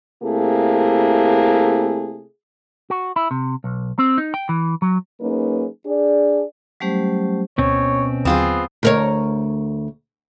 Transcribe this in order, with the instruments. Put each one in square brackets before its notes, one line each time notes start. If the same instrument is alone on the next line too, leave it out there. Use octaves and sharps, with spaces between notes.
[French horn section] C3 A3 A#3 E4 G#4
[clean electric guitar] F#4
E4
C3
B1
C4
D#4
G5
E3
F#3
[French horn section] F#3 A#3 C#4 D#4 G#4 B4
D4 G#4 D5
[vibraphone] F#3 G3 A3 C#4 G4 C5
[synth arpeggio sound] D2 [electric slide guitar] B2 C4 C#4 [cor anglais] C#5
[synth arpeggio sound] D#2 D3 F#3 [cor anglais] B3 [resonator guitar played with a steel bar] C4 F4 G#4
[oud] D2 A#4 C#5